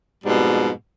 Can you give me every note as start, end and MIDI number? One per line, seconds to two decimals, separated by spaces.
0.25 0.69 41
0.25 0.69 44
0.25 0.69 47
0.25 0.69 55